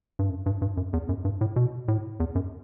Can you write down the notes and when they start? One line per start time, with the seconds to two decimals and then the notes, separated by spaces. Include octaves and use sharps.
0.19 G2
0.30 F#2
0.46 G2
0.62 G2
0.77 F#2
0.93 E2
1.09 F#2
1.25 G2
1.41 A2
1.56 B2
1.88 A2
2.20 E2
2.35 F#2